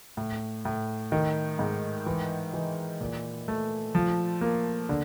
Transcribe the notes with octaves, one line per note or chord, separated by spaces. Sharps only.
A2
A2
D#3
G#2
E3
E3
A#2
A3
F3
A#3
D3